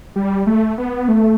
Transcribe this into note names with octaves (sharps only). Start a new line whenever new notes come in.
G3
A3
B3
A3